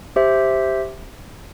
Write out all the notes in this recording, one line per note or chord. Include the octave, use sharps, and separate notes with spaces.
G4 C5 E5